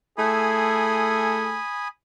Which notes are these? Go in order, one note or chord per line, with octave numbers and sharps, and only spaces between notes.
A3 E4 G#4 G#5 B5 D#6